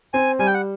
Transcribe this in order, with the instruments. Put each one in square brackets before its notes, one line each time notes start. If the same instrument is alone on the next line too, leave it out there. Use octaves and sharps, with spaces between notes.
[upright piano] C4 [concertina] G#5
[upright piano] G3 [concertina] G#5
[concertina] G5
F#5